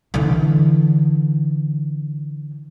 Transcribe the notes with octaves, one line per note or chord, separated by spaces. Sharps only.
D3 E3